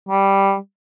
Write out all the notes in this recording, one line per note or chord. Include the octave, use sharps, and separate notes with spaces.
G3